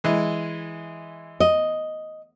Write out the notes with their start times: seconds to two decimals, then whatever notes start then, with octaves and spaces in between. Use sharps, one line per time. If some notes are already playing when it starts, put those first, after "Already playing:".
0.04 E3 G#3 E4
1.40 D#5